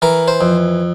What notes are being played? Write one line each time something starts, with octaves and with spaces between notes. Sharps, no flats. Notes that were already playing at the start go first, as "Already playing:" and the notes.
E3 A#4
C5
F2